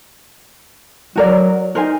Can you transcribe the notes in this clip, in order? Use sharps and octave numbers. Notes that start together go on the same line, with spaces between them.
F#3 F#4 A#4 D5
D#4 A#4 C5 G#5